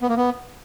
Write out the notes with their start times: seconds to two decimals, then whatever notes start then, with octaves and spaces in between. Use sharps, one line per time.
0.02 B3
0.09 A#3
0.17 B3